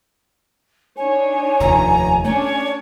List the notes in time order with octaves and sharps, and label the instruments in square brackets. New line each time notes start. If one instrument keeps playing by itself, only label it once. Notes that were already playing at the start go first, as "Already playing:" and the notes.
[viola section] D4 D#4 C#5 [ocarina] G#5
[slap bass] F1 D#2 [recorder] A#5
[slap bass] A3 [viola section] C#4 D4 [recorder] C#5